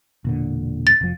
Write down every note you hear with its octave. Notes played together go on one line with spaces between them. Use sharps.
E1 A#2 D3
A6
F1 F3